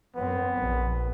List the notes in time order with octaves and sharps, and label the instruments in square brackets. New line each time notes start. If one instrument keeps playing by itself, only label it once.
[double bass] F#2 C4 [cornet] B3
[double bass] A#1